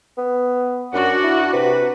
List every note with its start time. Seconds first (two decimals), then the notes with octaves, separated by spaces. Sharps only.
0.18 B3
0.93 F#2 D4 F#4 F#5
1.24 E4
1.53 C3 B4